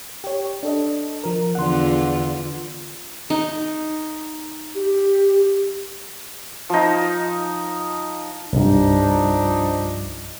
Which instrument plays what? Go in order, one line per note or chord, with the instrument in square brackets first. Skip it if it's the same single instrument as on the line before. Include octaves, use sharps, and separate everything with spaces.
[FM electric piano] G4 C#5
D4 A4 D#5
F3 A#4
[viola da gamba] E2 D3 F4 [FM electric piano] F#5 C6
[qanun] D#4
[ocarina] G4
[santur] F3 D#4
[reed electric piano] C2 G2 [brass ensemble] F3 D4 D#4